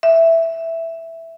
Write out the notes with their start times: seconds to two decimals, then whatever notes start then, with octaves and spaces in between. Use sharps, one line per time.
0.03 E5